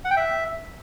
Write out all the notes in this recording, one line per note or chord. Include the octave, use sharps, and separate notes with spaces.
F#5
G5
E5